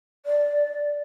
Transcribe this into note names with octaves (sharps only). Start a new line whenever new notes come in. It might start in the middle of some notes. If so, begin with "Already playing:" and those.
D5